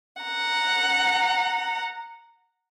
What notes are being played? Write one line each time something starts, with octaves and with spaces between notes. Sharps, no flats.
F#5 A#5